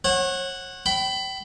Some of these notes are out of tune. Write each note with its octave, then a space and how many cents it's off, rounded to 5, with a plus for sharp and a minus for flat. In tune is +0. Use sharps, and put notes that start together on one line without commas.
C#5 -35 F#5 +0
G5 -25 B5 +20